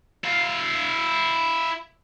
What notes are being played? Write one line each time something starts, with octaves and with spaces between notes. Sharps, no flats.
E4 F5